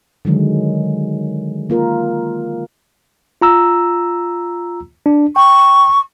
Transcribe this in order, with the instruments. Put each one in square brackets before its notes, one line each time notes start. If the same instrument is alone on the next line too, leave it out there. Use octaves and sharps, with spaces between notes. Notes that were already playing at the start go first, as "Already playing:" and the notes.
[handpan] D3 D#3 F#3 G#3
A#3 F4 A#4
[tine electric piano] F4 A#5 E6
D4
[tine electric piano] G5 [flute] C#6